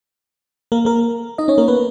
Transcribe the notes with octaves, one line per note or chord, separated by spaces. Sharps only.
A#3 A#4
A#3 A#4
D#4 D#5
C#4 C#5
A#3 A#4
B3 B4